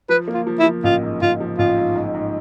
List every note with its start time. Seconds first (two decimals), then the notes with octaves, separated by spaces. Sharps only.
0.09 F3 B4
0.28 A#3
0.34 F4
0.47 F3
0.60 E4
0.66 F3
0.84 A1 F4
1.03 G#2
1.22 A1 F4
1.40 F3
1.58 A1 F4
1.78 G#2
1.95 G#2
2.14 G#2